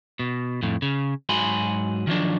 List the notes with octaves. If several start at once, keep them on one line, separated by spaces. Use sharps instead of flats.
B2
F2 A2
C#3
G#2 F#3 F#4 G#5 B5 C6
D#3 F3 F#3 D4